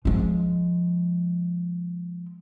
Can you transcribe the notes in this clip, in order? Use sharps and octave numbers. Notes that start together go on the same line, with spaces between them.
F3 G#3